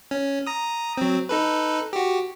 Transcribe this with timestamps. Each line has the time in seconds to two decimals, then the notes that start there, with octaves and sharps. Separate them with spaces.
0.11 C#4
0.47 A#5 D#6
0.98 F#3 C4
1.29 D#4 A4 B4
1.93 F#4 G4